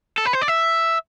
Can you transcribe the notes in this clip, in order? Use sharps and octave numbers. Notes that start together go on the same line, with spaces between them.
A4
B4
C5
D5
E5